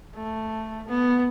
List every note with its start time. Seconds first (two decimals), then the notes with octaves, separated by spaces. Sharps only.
0.15 A3
0.88 B3